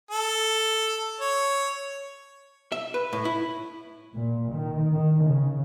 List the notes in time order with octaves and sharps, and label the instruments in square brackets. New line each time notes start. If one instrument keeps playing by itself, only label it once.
[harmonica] A4
C#5
[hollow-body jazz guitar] E5
B4
A2
E4
[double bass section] A#2
D#3
D#3
C#3